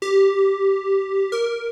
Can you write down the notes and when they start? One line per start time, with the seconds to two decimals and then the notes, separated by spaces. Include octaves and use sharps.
0.02 G4
1.32 A#4